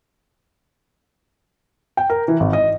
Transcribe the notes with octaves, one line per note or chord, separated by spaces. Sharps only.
G5
A#4
E3
G#1
D#5